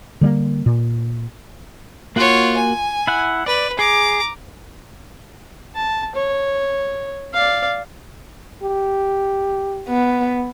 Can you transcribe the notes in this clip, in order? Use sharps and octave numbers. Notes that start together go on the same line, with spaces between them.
D3 G3 G#3 A#3
A#2
A#3 F4 F#4 C#5 F#5
G#5
E4 F#5
B4 D5
G#4 A#5 D6
A5
C#5
D5 F5
G4
B3